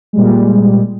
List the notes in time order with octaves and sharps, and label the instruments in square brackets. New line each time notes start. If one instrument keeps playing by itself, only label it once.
[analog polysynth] A#2 G3 G#3